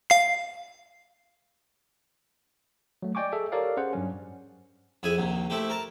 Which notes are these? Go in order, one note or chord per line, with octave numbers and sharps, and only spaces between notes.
F5 C7
F#3 A3
D5 D#5 G5 G#5 C#6 D6
G#4 A4 E5
G4 A4 A#4 C#5 D5 F5
C#4 G#4 C5 F#5
G2 F#3 C#4
F2 E4 G#4 G#5
A#1 D#2 C3
A3 C4 E4 G4
A#4 A5